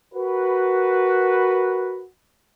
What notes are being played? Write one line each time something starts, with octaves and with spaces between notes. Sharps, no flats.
F#4 A#4 B4